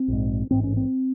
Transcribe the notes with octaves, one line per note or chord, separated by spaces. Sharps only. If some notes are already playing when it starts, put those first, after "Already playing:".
Already playing: C4
A#1 G#2
A1 G#2 C4
C#4
C4